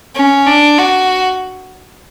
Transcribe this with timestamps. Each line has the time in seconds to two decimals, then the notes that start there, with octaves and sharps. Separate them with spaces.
0.16 C#4
0.47 D4
0.78 F#4